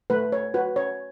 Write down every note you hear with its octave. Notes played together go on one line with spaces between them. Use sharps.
A3 B4
C#5
F#4 B4
C#5